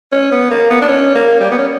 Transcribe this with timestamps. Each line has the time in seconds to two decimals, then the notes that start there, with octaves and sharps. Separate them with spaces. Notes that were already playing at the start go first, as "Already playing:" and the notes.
0.12 C#4
0.32 B3
0.51 A#3
0.70 B3
0.82 D4
0.88 C#4
1.15 A#3
1.40 G3
1.51 B3
1.58 C#4